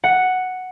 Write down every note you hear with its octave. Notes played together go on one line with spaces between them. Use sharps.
F#5